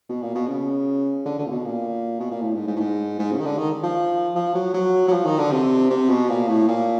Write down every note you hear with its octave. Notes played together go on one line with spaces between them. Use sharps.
B2
A#2
B2
C#3
D3
D3
A#2
B2
A#2
B2
A#2
A2
G#2
G#2
A2
G#2
G#2
C#3
D#3
D3
D#3
F3
F3
F#3
F#3
F#3
F3
D#3
D3
C3
C3
B2
A#2
A2
A#2